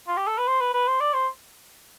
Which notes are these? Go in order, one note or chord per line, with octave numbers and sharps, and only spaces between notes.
F4
G4
A4
B4
C5
B4
B4
C5
D5
C5